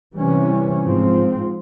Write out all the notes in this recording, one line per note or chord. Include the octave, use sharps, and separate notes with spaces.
C3 E3 G3 C#4
G#2 F3 C4